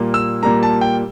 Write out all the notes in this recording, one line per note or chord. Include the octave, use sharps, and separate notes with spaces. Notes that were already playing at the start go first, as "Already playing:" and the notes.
Already playing: A#2 G3 A#3
E6
A#2 G3 A#3 A#5
A5
G5